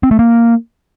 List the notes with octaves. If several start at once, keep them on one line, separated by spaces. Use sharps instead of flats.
C4
A3
A#3